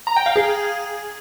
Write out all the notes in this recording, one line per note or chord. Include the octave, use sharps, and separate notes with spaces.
A#5
G5
F5
G#4